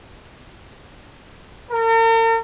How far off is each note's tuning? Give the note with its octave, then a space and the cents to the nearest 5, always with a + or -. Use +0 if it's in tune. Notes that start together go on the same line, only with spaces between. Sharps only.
A#4 -45